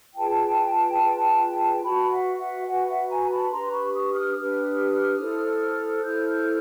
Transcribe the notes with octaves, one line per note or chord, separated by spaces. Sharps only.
F4 G#4 B4 G5 A5
F4 G#4 B4
F#4 B4 A5 B5
E5 F#5
E5 F#5
F#4 B4 F#5 G#5
E5 F#5
G#5 A#5
A#5
A5 B5
D4 G4 B4 A#5 C6
B5 C#6
C#6 D#6
D#6 F6
D4 G4 B4 D#6 F6
E4 A4 C5
F#6
E4 A4 C5 F6 G6